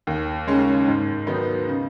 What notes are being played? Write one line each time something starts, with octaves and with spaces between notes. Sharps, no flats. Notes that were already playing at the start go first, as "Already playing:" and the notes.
D#2
C#3 G#3 C#4
G#2
D#3 F#3 B3 D#4
C#3